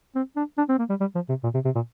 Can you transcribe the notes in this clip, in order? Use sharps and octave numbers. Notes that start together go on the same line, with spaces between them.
C4
D4
D4
C4
A#3
G3
G3
F3
C3
A#2
C3
C3
A#2